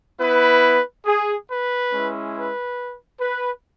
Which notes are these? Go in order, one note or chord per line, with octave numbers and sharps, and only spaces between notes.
B3 E4 B4
G#4
B4
G#3 C#4 E4
B4
B4